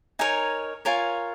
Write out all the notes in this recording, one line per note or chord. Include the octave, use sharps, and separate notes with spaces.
D#4 A#4 C#5 G#5
F4 A#4 C#5 G#5